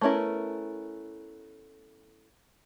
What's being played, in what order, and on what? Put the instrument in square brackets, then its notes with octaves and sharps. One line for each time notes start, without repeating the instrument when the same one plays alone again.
[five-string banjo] A3 B3 C#4 E4 A#4